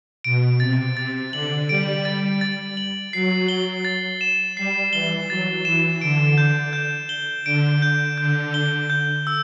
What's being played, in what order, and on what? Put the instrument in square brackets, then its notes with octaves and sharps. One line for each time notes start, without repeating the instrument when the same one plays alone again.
[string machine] B2 [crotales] D7
[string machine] C3 [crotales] A6
[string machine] C3 [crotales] A6
[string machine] D3 [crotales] F#7
[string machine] G3 [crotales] D7
[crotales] A6
A6
F#7
[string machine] F#3 [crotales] C7
[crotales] G7
A6
E7
[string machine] G3 [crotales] C7
[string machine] E3 [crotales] G7
[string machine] F#3 [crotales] A6
[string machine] E3 [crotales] E7
[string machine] D3 [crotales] D7
[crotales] G6
G6
G7
[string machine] D3 [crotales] D7
[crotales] G6
[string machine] D3 [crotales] G6
[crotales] G7
G6
E6